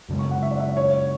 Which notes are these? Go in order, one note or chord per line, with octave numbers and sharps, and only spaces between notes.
F#2 C#3 G#3
C#6
F#5
E5
D5
E5
C#5